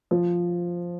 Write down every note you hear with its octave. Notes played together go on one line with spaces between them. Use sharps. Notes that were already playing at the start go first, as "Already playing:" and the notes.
F3